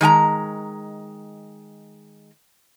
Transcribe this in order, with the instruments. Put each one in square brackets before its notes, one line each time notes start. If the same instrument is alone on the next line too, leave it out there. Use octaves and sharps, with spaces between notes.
[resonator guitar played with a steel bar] D#3 G#3 G#5 A#5